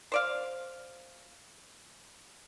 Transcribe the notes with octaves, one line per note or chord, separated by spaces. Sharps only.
C5 D5 F5